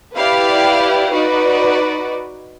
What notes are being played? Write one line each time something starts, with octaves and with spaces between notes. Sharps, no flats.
E4 G4 B4 D5 F5
D#4 F#4 B4 D5